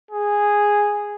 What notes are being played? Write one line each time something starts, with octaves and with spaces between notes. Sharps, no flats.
G#4